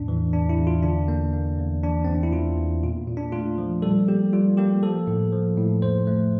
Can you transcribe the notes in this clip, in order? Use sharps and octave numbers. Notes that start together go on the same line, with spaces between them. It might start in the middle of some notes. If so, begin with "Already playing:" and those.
Already playing: E2 A2 D4
E3
E2 D4
E4
E2
F4
D3 D4
A#3
A#3
E2
E3 D4
E2 C4
D4
E4
E2 F4
E2
A#2 F4
A#2
D4
A3 F4
F3
G3 A4
A#3 G4
G3 F4
A#3 G4
F3 A4
A2
F3
A2
F2 C5
A3